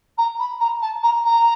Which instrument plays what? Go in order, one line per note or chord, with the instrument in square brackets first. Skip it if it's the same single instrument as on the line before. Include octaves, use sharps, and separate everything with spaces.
[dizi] A#5
B5
A#5
A5
A#5
A#5